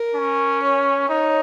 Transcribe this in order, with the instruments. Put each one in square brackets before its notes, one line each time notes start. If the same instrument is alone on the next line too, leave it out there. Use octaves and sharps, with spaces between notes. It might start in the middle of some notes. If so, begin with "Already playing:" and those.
Already playing: [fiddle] A#4
[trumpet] C#4
[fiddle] C#5
[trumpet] D#4 [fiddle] C#5